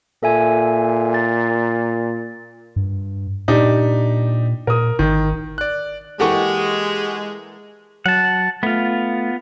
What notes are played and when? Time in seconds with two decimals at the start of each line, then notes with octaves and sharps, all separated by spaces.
0.23 A#2 A4 E5 G#5
1.14 A6
2.76 G2
3.48 A#2 D4 D#4 G4
4.67 A#2 A#4 D#6
4.99 G#1 D#3
5.58 D5 F#6
6.20 E3 G#3 A#3 G4 A4 F#5 C#6
8.06 F#3 F#5 A5
8.63 A3 B3 F4